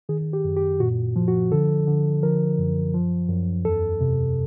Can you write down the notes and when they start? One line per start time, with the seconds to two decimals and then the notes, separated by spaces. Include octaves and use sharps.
0.09 D#3 G#4
0.33 G4
0.45 F#2
0.57 G4
0.80 A#2 F#4
1.16 F3
1.28 F#4
1.52 D3 A4
1.88 D3
2.23 F3 A#4
2.58 F#2
2.94 F3
3.29 F#2
3.65 E2 A4
4.01 C3